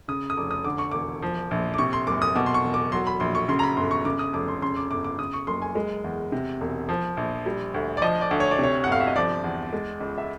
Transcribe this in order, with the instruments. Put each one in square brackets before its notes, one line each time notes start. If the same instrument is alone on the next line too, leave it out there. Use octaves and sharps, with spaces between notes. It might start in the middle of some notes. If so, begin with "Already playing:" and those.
[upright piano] C#3 D#6
D#6
F1 D6
D#6
D3 D6
C#6
E1 D6
F3
A#1
D6
C3 C#6
C6
F#1 D6
D#6
B2 D6
C6
C#6
E1
D6
F#3 C6
B5
A#1 C6
C#6
C#3 C6
A#5
B5
G1 C6
C#6
C#3 D6
D#6
F1 D6
C6
C#3 C6
D6
G1 D6
D6
C#3 D#6
C#6
F#1 C6
G#5
G#3
E2
C3
E1
F3
A#1
G3
D2
D5
F3 D#5
D5
D2
C#5
D5
C3 C#5
F#5
G1 F5
E5
D#5
F3 D5
E2
G#3
C#2
E5